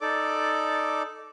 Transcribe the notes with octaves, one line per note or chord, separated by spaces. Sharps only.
D#4 A4 D5 D6